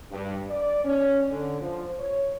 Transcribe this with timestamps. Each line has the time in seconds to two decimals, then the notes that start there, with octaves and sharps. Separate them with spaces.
0.12 G2
0.50 D5
0.85 C#4
1.31 D3
1.61 F3
1.99 C#5